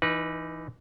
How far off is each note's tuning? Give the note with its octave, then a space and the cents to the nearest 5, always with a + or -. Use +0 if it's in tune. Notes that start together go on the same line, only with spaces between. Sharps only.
E3 +15 D#4 +0 B4 -25